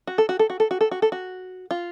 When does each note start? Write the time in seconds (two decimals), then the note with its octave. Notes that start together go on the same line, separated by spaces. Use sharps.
0.07 F#4
0.18 A4
0.29 F#4
0.39 A4
0.50 F#4
0.60 A4
0.71 F#4
0.81 A4
0.91 F#4
1.02 A4
1.12 F#4
1.71 F4